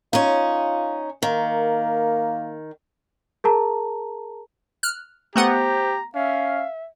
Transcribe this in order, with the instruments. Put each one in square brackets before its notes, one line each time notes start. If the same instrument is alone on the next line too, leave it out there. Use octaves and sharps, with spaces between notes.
[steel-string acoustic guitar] C#4 D#4 [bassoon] F4
[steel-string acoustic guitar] D#3 [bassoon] A#3
[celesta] G#4 A#4 A5 A#5
[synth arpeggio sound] F6 F#6
[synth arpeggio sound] A3 B3 F#5 [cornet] G4 [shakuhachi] C5 [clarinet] A#5
[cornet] C#4 [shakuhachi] E5 [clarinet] F5